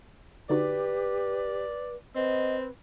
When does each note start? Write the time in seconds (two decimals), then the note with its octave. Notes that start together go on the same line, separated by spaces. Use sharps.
0.50 D3 D#4 F#4 G4 B4 D5
2.16 C4 B4 D#5